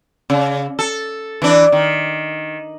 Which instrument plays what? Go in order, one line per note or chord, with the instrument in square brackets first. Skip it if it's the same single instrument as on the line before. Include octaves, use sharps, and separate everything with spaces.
[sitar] C#3
A4
E3 D4
D#3